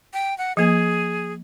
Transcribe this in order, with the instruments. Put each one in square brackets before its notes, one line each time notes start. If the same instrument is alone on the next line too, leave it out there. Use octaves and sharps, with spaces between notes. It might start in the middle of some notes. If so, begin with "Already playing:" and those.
[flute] G5
F#5
[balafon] F3 A#3 [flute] G#4